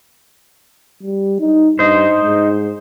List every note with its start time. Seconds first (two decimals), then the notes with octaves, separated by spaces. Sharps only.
1.03 G3
1.40 D#4
1.79 G2 D#4 C5
2.20 G#2